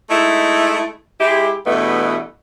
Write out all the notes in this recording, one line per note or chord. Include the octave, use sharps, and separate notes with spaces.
G#3 A3 D#4 E4
G#3 E4 G4
E2 G2 B2 E3 A3 B3